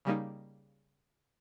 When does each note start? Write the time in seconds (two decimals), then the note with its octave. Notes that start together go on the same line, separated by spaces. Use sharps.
0.05 C#3 G3 A#3 D#4